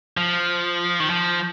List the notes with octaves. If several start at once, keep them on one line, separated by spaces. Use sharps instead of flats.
F3
D#3
F3